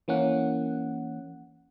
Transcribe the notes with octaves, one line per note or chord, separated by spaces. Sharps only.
E3 A#3 C#4 F#5